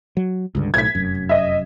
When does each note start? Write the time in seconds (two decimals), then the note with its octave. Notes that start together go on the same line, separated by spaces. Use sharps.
0.17 F#3
0.55 C#2 G2 D3
0.74 B1 A2 G#6 B6
0.95 F1 F#2
1.29 D#5 E5